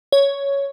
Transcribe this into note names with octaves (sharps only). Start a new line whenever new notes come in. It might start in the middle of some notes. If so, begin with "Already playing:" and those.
C#5